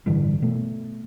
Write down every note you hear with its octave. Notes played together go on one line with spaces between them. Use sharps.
A1 G2 D3 E3
B2 A3